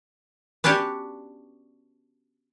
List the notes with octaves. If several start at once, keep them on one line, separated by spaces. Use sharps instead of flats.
B3 C#4 D4 F#4 G4